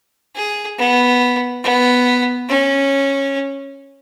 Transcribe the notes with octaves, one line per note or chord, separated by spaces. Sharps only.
G#4
B3
B3
C#4